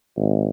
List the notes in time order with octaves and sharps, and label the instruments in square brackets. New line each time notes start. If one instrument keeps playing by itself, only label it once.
[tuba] G#1